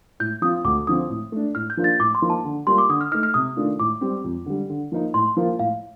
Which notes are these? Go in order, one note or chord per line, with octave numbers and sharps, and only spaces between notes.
A2 G6
F3 C4 F4 D#6
D2 D6
D3 F3 C4 D#6
A2
A3 D4
A2 F6
G6
F3 A#3 D4 F4
A6
A2 D6
C6
F3 A#3 D#4
A5
D3
G3 A#3 F4 C6
D6
D3 D#6
F6
A3 D#4 F6
F6
C3 D#6
D#3 A3 D4 F4
A2 D6
G3 C4
F2
D3 G3
D3
F3 A#3 D#4
A2 C6
F3 A#3 F4
A2 F5